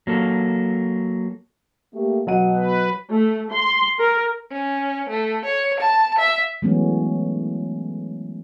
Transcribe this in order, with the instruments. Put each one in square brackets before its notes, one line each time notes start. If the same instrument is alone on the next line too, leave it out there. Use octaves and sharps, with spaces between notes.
[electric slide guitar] F#3 A#3 A4
[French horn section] A3 A#3 G4
[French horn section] B2 D#5 [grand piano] F#3 F#5 D#7
[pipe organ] B4
[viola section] A3
C6
A#4
[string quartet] C#4
A3
C#5
A5
E5
[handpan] E3 F#3 G#3 A3 B3 C#4